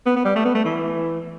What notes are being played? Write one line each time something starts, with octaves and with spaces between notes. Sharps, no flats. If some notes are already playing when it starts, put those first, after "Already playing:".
B3
B3
G3
A3
B3
A3
E3